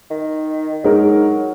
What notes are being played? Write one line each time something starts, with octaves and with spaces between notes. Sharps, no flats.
D#3
F#3 G#3 D#4 A#4